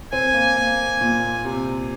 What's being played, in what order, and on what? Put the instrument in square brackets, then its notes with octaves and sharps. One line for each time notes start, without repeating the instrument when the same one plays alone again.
[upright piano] C4 [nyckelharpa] G#5
[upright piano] A#3
A#3
A#2
C3